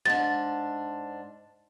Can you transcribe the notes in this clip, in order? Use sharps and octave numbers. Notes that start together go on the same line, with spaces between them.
G#2 D4 A6